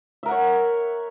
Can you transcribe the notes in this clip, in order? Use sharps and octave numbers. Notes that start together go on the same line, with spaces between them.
A#4 C#5 E5 F#5